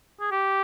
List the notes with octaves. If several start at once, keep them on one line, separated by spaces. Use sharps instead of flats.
G#4
G4